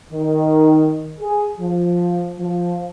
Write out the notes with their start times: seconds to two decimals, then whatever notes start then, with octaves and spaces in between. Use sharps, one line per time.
0.12 D#3
1.20 G#4
1.59 F3
2.39 F3